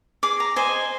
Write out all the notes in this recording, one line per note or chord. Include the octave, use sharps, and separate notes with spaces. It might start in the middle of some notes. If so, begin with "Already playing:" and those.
G#4 D6
A#5
C5 D#5 G#5